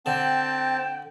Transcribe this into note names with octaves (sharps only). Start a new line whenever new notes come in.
D3 C4 G5 A5